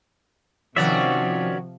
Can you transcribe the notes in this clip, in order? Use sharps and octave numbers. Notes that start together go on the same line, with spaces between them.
C3 D#3 F3 C#4 F#4 C#5 D5 E5